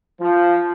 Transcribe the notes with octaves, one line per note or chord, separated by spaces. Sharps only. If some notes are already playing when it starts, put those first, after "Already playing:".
F3